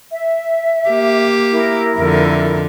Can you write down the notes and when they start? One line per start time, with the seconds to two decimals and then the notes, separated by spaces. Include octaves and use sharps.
0.11 E5
0.89 A#3 G4
1.52 E4 A#4
1.97 F2 D3